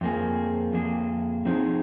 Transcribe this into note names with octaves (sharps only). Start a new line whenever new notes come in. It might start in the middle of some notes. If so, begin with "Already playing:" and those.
F2 F3 A#3 G#4
F2 F3 A#3 G#4
F3 C4 D#4 G#4